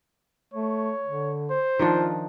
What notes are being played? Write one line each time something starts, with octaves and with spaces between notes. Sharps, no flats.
A3 C#5
D3
C5
D#3 F3 D4 F4